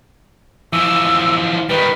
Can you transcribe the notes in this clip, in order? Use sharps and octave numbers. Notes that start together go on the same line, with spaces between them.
E3 F3 E6
D#3 G3 B4